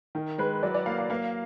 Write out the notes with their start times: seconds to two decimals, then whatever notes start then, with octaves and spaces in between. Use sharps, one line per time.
0.15 D#3 A#4
0.38 G#3 B4
0.63 F#3 D5
0.75 D5
0.86 A#3 F5
0.98 F5
1.10 A#3 F5